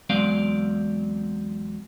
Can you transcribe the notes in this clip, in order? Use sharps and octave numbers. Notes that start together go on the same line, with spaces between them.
E2 F#3 G#3 C4 D5 F5